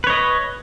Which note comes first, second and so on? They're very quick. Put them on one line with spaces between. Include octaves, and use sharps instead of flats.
B4 C#5 D#5